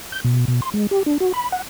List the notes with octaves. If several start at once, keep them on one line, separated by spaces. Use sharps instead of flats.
G6
B2
B2
C6
G#3
G4
D4
F#4
B5
F#5